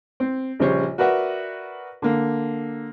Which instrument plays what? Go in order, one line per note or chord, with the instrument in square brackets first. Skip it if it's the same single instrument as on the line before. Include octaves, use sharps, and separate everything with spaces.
[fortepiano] C4
A#1 C#3 G3 C5 C#5 C#6
F#4 A#4 B4 D5 E5 F#5
D3 A#3